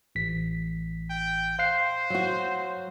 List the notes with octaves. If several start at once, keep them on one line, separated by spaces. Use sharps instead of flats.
A1 B6
G5
C5 F5 F#6 C7
F#3 F#4